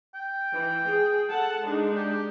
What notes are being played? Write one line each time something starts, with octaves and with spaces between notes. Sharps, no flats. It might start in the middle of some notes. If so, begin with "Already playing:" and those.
G5
E3
G#4
A4 F#5 A5
G#3 D4 D#4
G4